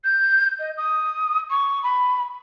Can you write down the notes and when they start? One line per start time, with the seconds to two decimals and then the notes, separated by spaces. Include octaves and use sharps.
0.04 G6
0.59 D#5
0.77 D#6
1.49 C#6
1.83 B5